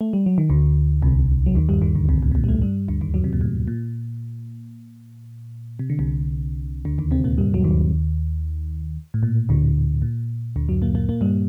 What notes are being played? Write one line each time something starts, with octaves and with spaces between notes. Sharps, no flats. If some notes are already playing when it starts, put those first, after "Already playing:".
A3
G3
F#3
D#3
D2 D3
C2 C3
F#3
D#2 D#3
G2 G3
D#2 D#3
D2 D3
C2 C3
A2
C3
A#2
G3
A2 A3
G2 G3
D2 D3
D#2 D#3
F#2 F#3
C3
A#2
A2
A#2
C3
D3
C2 C3
D2 D3
D#2 D#3
C3 C4
A#2 A#3
G2 G3
F#3
D#2 D#3
A2
A#2
D2 D3
A#2
D2 D3
F#2 F#3
A#2 A#3
A#2 A#3
A#2 A#3
G2 G3